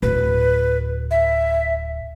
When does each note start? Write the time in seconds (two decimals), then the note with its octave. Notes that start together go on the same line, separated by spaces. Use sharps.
0.03 D1 B4
1.11 E5